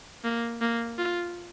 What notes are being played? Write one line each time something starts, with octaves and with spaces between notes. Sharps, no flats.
A#3
A#3
F4